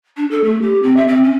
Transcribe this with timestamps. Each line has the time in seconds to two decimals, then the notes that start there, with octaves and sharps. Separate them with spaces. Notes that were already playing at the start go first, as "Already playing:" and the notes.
0.17 D4
0.31 A4
0.44 A3
0.62 G4
0.83 C4
0.96 E5
1.08 C4
1.23 C#4